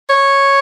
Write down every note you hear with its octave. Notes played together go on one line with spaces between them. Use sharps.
C#5